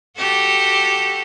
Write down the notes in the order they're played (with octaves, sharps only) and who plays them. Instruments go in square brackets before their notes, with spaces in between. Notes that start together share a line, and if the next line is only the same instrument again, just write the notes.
[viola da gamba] F#4 G4 A4